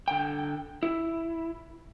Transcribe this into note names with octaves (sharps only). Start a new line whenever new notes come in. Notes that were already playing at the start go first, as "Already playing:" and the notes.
D3 G5
E4